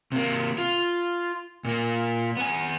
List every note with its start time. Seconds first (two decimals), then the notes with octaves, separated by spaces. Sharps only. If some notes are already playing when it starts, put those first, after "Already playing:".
0.12 C3 A#3
0.58 F4
1.65 A#2 A#3
2.37 B3 G#5